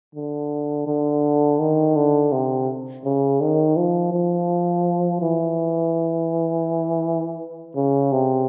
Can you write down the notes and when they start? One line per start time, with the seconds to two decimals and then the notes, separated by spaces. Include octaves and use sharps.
0.15 D3
0.87 D3
1.59 D#3
1.96 D3
2.32 C3
3.05 C#3
3.41 D#3
3.76 F3
4.13 F3
5.22 E3
7.75 C#3
8.12 C3